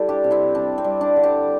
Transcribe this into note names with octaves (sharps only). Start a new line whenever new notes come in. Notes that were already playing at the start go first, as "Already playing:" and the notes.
Already playing: G3 E4 A4 C5
D4 G4
C3
C4 E4
G3 D4
C4
G3
D4
D3
D4 G4